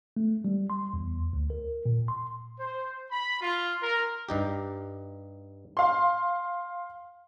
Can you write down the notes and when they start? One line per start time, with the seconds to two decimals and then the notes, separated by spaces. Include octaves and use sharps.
0.17 A3
0.45 G3
0.70 C6
0.93 E2
1.33 D2
1.50 A#4
1.86 A#2
2.08 C6
2.59 C5
3.11 B5
3.41 F4
3.83 A#4
4.29 G2 D#4 G4
5.77 F5 C6